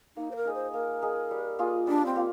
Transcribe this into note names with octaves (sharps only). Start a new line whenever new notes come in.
A#3 D#4
C5
A#4
D#4 G#4 D#5
C5
A#3 A#4
D#4 G#4 D#5
G3
A#3 F4 G#4
G3 D4
C4
A#3 F4